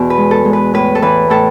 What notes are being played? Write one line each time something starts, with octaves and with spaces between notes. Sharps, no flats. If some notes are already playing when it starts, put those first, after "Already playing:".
Already playing: E2 B2 F#4
B4
G#3
A4
G#3
B4
A2 B4
A4
E3 B4
A2 A4